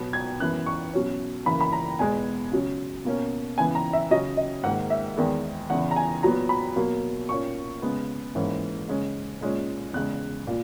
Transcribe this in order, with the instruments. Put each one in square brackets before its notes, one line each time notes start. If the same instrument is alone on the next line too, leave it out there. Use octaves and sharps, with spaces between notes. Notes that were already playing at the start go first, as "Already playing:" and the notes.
Already playing: [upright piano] B2 F#3 B3
G#6
F#2 E3 B3 F#6
C#6
B2 F#3 C#4
F#2 C#3 E3 A#3 B5
B5
A#5
E2 B2 G#3 B3 G#5
C#3 F#3 C#4
B2 A#3 C#4
C#3 E3 B3 G#5
A#5
E5
C#3 F#3 C#4 D#5
D#5
G#2 D#3 A#3 F#5
E5
E2 D#3 G#3 B3
E2 C#3 E3 F#5
A#5
G#5
A#2 F#3 B3 A#5
B5
B2 F#3 A#3
A#2 A#3 C#4 C#6
C#3 G#3 B3
G#2 E3 A#3 C#4
C#3 G#3 C#4
A#2 G#3 C#4
E2 C#3 G#3 F#6
A#2